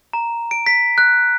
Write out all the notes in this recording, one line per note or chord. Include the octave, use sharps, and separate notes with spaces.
A#5
D7
B6
F#6